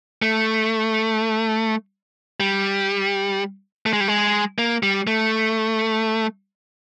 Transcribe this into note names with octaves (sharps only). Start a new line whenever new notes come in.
A3
G3
A3
G#3
G3
G#3
A#3
G3
A3